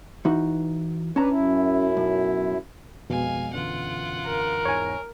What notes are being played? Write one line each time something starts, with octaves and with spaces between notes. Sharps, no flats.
E3 D#4 F#4
C#4 D4 B4 A5 A#5
F#2 E4
B1
F2 B2 G#3 F5 G#5
F#2 D3 E3 F4 F#5
A#4
E2 G#2 C#5 G#5